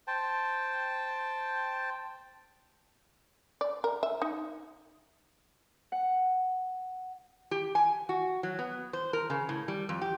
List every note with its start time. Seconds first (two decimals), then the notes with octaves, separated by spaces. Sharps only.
0.07 C5 G5 A5
3.61 D5
3.84 A#4
4.03 E5
4.22 D#4
5.92 F#5
7.51 G4
7.75 G#5
8.09 F#4
8.43 F#3
8.59 B3
8.93 C5
9.13 A#4
9.30 C#3
9.49 A2
9.68 G3
9.89 F2
10.01 G4